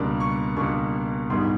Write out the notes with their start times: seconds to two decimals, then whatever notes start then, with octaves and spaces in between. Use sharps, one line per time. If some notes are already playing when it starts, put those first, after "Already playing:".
Already playing: C#2 B2 G3 A#3 D4
0.20 C#6
0.56 C#2 B2 G3 A#3 D4 C#6
1.30 A#1 G#2 D#3 G3 B3 C6